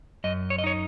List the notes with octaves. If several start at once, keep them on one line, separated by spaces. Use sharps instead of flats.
F#2 D#5
C#5
D#5
D#4 C#5